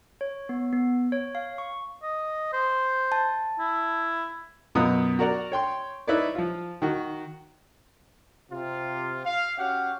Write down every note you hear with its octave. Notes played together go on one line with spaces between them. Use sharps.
C#5
B3
B3
C#5
F5
C#6
D#5
C5
A5
E4
F#2 B2 B3 F4 A#5 D#6
F#4 A#4 D5 F#5
C#5 G5 C6
D#4 E4 B4 C#5 D5
F3 F4
D#3 F#4
C3 F4
F5
C#4 F#4 G4 F5 F#5